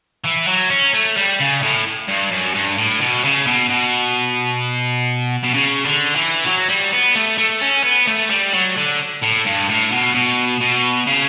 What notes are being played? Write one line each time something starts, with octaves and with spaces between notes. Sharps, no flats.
E3
F#3
C#4
A3
G3
C#3
A2
G2
F#2
G2
A2
B2
C#3
B2
B2
B2
C#3
D3
E3
F#3
G3
B3
A3
A3
C#4
B3
A3
G3
F#3
D3
A2
G2
A2
B2
B2
B2
C#3